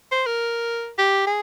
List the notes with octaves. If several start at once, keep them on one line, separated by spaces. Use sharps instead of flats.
C5
A#4
G4
G#4